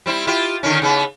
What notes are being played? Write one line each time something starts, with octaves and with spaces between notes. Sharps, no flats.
G3 C4 E4
E4 F4 G4
D3 D#3 C#4
C#3 B3